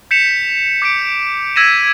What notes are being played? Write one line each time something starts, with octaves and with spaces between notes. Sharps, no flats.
G6 B6 C#7 E7 F7
D6 G6 C#7 D7
E6 G#6 A#6 B6 D#7 E7